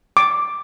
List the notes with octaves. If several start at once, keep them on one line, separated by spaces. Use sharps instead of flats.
D6